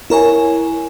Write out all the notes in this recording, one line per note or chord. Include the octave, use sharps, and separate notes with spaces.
E4 A#4 C#5 G#5